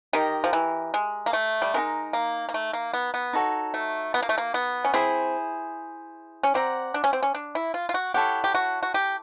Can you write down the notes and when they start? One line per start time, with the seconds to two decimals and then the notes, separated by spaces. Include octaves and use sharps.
0.13 D#3 G4 A#4 D#5
0.44 F3
0.53 E3
0.94 G#3
1.26 A#3
1.33 A3
1.62 G3
1.74 G#3 D#4 G4 A#4
2.13 A#3
2.49 A#3
2.54 A3
2.73 A#3
2.93 B3
3.14 B3
3.33 D#4 F#4 A4 C#5
3.74 A3
4.14 B3
4.22 A#3
4.29 A3
4.38 A#3
4.54 B3
4.85 C#4
4.94 C4 E4 G#4 C5
6.43 C#4
6.54 C4 D5 F#5 A#5
6.94 D4
7.04 C#4
7.13 C4
7.23 C#4
7.35 D4
7.55 E4
7.74 F4
7.89 F4
7.94 F#4
8.14 E4 G4 A4 C#5 F#5
8.44 G4
8.55 F#4
8.83 F#4
8.94 G4